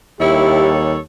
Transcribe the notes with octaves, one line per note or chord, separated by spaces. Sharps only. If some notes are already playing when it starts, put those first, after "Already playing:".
D#2 G3 E4 G4 A4 C#5